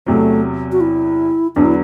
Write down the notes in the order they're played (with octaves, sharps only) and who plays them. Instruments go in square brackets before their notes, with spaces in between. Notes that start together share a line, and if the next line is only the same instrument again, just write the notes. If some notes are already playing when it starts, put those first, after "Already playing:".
[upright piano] E2 C3 F#3 [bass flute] A3
[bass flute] F#4
E4
[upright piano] E2 D3 F#3 B3 [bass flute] D4
[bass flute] E4